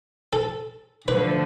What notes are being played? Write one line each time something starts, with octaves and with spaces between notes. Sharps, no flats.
A4
D3 F3 A3 B4